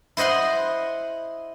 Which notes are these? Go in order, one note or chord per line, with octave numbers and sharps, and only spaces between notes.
E4 C5 D#5 F#5 C6